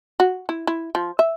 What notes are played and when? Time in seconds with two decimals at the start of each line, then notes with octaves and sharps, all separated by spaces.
0.20 F#4
0.49 E4
0.67 E4
0.95 F3
1.19 E5